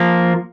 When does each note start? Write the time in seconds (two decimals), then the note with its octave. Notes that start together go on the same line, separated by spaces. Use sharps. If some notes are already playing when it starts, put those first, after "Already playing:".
Already playing: F3 A#3